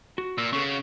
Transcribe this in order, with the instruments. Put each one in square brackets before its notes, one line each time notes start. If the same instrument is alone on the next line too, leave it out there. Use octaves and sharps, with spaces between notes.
[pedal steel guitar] F#4
[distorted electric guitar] A#2 [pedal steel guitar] E6
[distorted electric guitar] C#3 [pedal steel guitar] B3 A4 C#6
[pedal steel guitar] F#4